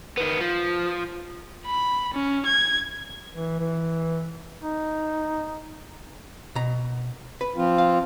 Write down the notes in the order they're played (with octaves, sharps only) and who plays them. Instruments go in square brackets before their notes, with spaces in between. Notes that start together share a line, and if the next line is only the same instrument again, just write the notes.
[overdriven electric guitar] D#3 B3
F3
[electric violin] B5
C#4
G#6
[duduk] E3
E3
D#4
[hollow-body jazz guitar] B2 A#5
B4
[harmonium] F3 C4 F4
[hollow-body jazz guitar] F5